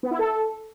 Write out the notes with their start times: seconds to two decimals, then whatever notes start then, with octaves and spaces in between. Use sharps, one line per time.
0.03 B3
0.11 E4
0.19 A4